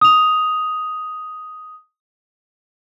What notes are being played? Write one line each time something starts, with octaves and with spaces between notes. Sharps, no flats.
D#6 F7